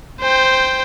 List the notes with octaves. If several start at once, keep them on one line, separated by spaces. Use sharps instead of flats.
C5 G5